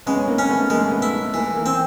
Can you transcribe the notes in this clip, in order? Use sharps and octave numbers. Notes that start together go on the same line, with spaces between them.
G#3 B3 C#4
A#3 C4
C#4
A3 B3
G#3 A#3
A3 B3
E4
A3
E3 A#3
A#3
C4